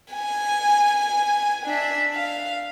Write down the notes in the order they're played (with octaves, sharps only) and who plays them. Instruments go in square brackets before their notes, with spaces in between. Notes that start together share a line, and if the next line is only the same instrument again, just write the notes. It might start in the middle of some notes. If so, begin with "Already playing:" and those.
[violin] G#5
D4 E5
F5